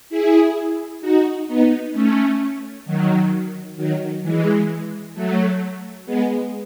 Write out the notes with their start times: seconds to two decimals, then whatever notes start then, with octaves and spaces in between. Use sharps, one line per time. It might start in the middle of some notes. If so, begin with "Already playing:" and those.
0.10 E4 G#4
1.01 D#4 F#4
1.48 B3 D#4
1.93 A3 C#4
2.86 D#3 F#3
3.77 D#3 F#3
4.23 E3 G#3
5.14 F#3 A3
6.06 G#3 B3